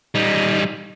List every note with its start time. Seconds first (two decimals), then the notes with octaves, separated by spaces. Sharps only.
0.15 G3 D#4